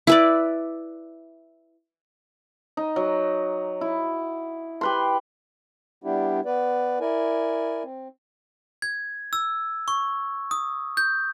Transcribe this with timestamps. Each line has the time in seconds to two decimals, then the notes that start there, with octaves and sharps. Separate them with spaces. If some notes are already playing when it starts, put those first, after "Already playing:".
0.07 E4 B4 D5
2.77 D#4
2.96 F#3
3.81 E4
4.81 G4 B4 C6
6.04 G3 B3 D4 E4 G4
6.46 B3 B4 D5
7.00 E4 A#4 D5 G#5
7.83 C4
8.82 G#6
9.33 E6
9.88 C#6
10.51 D#6
10.97 G6